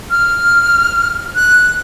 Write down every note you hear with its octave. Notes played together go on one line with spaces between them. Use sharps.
F6
F#6